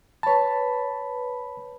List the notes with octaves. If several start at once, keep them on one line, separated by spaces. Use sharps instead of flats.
B4 C#5 A5 B5